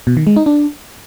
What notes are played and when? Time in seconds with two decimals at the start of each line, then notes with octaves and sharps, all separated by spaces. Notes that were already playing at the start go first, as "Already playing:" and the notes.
0.07 B2
0.17 D#3
0.27 G#3
0.36 D#4
0.46 D4